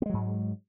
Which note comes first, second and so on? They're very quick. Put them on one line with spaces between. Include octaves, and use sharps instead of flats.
B3 G#3 F#3 G#2